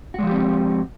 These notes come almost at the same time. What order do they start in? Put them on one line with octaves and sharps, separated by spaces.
F#4 G#3 F3 G4 C4